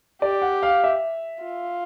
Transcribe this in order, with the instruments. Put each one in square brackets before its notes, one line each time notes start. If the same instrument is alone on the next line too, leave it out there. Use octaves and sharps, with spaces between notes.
[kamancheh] G4 [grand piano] D5
[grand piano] F#5
F5
E5
[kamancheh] F4